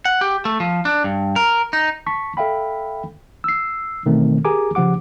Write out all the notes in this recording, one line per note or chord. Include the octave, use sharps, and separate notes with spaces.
F#5
G4
A3
F3
D4
G2
A#4
D#4
A5 C#6 B6
A4 E5 F5 G5 B5
E6 C7
B2 D#3 E3 A3 C4
G4 G#4 A#4 G#5 A#5 D6
C#3 F3 G4 F#5 D6